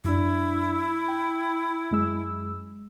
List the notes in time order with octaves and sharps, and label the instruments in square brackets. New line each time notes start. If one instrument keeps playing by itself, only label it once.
[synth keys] F#2 D4 [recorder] E4
[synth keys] G5
F#2 G#3 E6